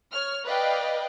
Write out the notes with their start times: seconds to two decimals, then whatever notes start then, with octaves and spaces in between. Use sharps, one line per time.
0.11 C#5 F6
0.44 B4 D5 D#5 F5 G5